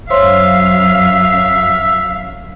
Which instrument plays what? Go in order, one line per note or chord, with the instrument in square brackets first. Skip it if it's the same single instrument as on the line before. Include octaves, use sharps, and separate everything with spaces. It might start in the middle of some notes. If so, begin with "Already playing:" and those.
[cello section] F#2 F#3 F5 [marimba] C5 C#5 C6 [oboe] E5